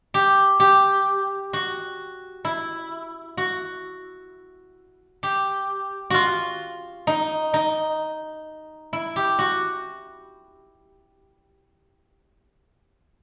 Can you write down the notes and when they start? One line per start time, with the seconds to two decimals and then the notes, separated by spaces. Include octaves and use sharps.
0.14 G4
0.60 G4
1.53 F#4
2.45 E4
3.37 F#4
5.23 G4
6.10 F4 F#4
7.07 D#4
7.54 D#4
8.93 E4
9.16 G4
9.39 F#4